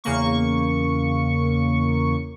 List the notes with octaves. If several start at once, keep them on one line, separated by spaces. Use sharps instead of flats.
E2 C#3 A#3 C#6